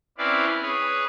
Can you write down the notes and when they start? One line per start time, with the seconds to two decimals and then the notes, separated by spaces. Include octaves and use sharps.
0.18 C4 C#4 E4 B4 D5 F5
0.62 G#4 B4 C#5